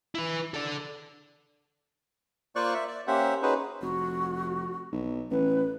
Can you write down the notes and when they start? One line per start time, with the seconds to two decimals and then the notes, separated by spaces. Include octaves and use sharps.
0.15 E4 B4
0.54 A4 D5
2.56 A#3 F4 C5 D5 C#6 F#6
2.74 E5
2.88 D5
3.07 A#3 C#4 G4 C5 E5 F#5
3.42 C#4 D#4 F#4 G#4 B4 C5
3.82 F1 F#4
4.92 B1
5.31 A1 B4